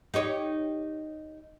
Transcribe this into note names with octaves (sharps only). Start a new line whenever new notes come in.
D#4 G4 C#5